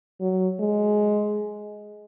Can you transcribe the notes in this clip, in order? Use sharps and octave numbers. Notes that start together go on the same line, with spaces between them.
F#3
G#3